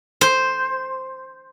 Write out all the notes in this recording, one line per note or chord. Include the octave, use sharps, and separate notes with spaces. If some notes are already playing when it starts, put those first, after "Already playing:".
C5